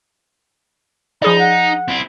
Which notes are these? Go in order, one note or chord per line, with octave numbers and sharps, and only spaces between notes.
F3 D#4 G#4 D5 B5
F#5
C4 E4